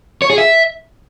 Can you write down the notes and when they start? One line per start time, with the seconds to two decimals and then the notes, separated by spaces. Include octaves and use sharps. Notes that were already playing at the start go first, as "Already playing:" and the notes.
0.22 C#5
0.30 G#4
0.38 E5